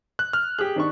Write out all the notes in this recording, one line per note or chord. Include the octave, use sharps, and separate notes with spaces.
F#6
F6
G4 G#4 F#6
D#3 D4 C#6